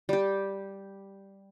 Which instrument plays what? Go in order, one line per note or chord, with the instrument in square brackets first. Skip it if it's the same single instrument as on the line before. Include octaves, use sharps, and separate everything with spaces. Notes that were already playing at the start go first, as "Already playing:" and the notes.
[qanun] G3 G4